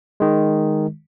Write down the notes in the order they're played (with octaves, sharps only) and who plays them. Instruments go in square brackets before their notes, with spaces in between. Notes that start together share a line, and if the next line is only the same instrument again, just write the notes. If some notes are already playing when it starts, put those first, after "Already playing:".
[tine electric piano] D#3 G#3